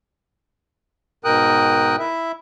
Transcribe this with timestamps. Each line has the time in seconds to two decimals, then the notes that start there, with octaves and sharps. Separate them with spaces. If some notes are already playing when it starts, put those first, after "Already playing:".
1.24 G#2 B2 A#4 G5 D#6 F#6
1.99 E4 E5